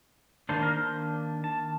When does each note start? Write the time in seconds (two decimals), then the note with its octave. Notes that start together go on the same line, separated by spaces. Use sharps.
0.49 D#3 A#3 D4 C5
0.63 A#4
0.75 C5
1.44 A5